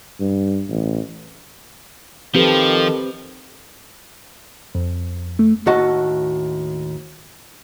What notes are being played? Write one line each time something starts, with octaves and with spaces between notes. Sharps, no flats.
G2
A1
D#3 F3 C4 G4 A4 B4
F2
A3
D#2 A2 F#4 D#5 F#5 A5